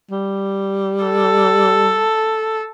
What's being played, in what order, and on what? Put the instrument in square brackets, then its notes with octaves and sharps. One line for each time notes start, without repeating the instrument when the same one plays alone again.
[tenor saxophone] G3
[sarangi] A4